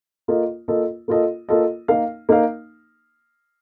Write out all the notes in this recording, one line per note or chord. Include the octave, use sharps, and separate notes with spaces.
A#3 F4 A4 D#5
A#3 F4 A4 D#5
A#3 F4 A4 D#5
A#3 F4 A4 D#5
A#3 D#4 A#4 F5
A#3 D#4 A#4 F5